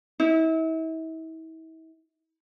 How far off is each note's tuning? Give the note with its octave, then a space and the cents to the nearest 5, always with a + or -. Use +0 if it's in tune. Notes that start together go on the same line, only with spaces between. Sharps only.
E4 -40